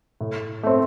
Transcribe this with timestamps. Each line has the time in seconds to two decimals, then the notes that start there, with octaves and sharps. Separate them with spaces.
0.21 A2
0.63 A3 C4